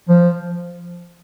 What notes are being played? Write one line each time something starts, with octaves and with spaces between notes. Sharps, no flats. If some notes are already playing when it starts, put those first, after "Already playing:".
F3